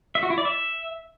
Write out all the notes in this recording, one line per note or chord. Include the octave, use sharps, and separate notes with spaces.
E5
F#4
E4
D5
E5